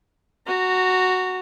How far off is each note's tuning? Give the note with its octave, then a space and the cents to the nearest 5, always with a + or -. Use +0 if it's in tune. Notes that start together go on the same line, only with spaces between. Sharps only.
F#4 +0 A#5 -25